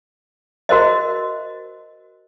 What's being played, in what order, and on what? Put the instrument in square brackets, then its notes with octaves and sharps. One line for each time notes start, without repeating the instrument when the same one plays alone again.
[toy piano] F#4 A#4 C5 D#5